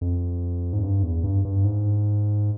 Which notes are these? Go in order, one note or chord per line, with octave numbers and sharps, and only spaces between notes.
F2
G#2
G2
E2
G2
G2
G#2